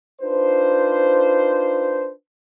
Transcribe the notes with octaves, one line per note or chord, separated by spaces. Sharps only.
D4 D#4 F4 B4 C5